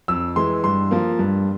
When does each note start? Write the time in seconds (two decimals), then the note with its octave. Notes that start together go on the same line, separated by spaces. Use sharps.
0.08 F2 E6
0.36 E3 G#3 C6
0.64 G2 C6
0.91 F3 A#3
1.19 G2